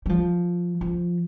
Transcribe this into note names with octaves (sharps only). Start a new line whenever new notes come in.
G3
F3
F3